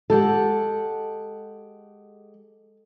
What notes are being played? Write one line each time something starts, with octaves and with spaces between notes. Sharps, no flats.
G#3 G4 A4 F#5